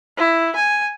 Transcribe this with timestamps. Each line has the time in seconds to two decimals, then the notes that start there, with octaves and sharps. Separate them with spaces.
0.17 E4
0.56 G#5